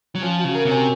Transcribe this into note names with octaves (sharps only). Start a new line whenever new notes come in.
F#3
F3 C#4
F#4
C#3
A#4
C3
C#4